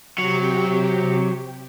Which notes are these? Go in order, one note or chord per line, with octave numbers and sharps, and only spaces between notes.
C3 F#3 G4